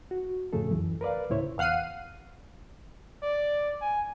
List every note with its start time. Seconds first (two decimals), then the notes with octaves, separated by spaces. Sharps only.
0.11 F#4
0.53 F2 A2 C#3 A3 G#4 A4
0.71 C#2 F#2 E3
1.01 A#4 B4 D5 F5
1.30 D2 A2 C#3 E4 C5 C#5
1.58 E2 F5 F#5 C7 D#7
3.23 D5
3.82 G#5